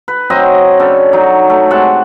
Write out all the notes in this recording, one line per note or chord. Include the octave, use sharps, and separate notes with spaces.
B4
F#3 C4 C5 D#5
C#3 D4 A4
F#3 D#4
A3
C3 G#3 F#5 A5